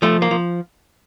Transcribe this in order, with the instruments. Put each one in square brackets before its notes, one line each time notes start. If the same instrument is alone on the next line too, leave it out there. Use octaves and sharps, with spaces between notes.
[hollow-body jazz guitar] F3 A3
A#3
F3